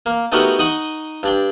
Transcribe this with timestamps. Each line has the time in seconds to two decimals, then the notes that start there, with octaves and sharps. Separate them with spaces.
0.06 A#3
0.32 A3 B3 D#4 F#4 G4 A#4
0.59 D#4 D#5 F#5 C#6
1.23 G2 D4 G5